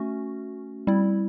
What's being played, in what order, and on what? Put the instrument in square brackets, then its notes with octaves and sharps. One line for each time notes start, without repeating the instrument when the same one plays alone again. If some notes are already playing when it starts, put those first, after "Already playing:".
Already playing: [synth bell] A3 C#4 F#4
G3 C4 E4